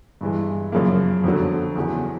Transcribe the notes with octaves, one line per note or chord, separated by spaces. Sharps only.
G2 E3 G#3
F#2 C#3 F3 A#3
F2 D3 F#3
E2 C#3 F#3